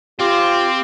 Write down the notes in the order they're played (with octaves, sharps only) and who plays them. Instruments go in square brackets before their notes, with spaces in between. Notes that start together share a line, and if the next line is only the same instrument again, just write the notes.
[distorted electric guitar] C4 [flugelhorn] F4 [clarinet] G4